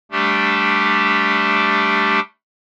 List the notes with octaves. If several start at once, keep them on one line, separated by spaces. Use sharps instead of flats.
G3 A3 D4 G4